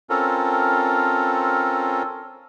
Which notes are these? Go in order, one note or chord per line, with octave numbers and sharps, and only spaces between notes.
C4 C#4 F4 A4 A#4